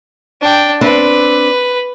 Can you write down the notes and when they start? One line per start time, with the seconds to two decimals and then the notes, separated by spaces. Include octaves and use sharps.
0.41 D4 G5
0.81 C4 D4 B4 D5